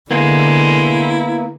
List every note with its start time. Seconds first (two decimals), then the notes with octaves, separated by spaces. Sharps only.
0.11 D3 G#3 A#3 B3 E4